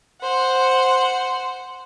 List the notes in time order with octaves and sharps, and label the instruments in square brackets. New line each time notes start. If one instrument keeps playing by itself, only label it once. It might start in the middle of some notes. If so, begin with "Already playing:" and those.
[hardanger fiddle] C5 F#5